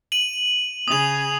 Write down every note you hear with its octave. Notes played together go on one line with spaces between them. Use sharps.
D#7 F#7
C#3 G#4 D#6 F7